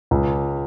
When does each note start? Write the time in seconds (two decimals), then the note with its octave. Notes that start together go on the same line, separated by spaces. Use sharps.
0.11 C#2